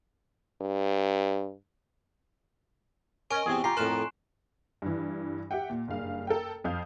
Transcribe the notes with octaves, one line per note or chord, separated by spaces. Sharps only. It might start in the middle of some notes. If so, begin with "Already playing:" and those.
G2
C#4 A#4 D#5 G#5 C#6 D7
E2 C3 C4 G#4
F4 G4 A#5 C7
F2 A2 A#4 B4 C6 F#6 E7
G2 E3
G4 E5 F#5 G5
A#2
F#1 G2 F5
A4 A#4 G5
F2 F5 G6